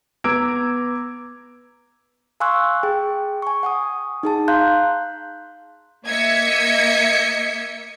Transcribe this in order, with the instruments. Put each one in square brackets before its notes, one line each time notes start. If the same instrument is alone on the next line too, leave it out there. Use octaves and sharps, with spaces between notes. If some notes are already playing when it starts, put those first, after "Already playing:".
[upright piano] B3 A#5 D6 E6 G#6 D7
[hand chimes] F5 G#5 C6 C#6 E6 F#6
G#4 G5
G#5 C#6
F#5 G#5 D#6
D#4 G#4 A5
F5 A#5 C6 F#6 G6
[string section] A#3 D#5 E5 G#6 B6 C#7